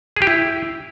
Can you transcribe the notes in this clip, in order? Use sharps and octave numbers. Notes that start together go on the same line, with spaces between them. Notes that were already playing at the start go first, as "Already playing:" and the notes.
G#4
G4
E4